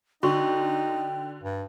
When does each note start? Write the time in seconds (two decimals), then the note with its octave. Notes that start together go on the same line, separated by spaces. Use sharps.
0.23 D3 D#4 F#4 G5 C6 C#6
1.43 G2